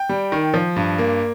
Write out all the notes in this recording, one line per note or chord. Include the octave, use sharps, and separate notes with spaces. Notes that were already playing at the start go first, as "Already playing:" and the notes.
Already playing: G5
G3
D#3
F3
G2
A#3